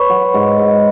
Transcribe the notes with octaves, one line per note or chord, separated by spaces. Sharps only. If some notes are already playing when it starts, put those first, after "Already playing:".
Already playing: B4 C#5
F#3
G#2
G#2